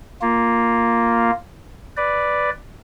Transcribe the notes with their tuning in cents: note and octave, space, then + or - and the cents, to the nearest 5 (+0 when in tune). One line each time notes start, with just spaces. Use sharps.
A#3 +0 F4 +0
B4 +0 D5 +0